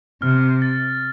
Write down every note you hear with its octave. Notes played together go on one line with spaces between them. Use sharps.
C3 F6
A6